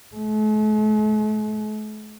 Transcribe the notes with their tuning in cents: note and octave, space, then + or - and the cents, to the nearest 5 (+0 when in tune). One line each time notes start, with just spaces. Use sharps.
A3 -45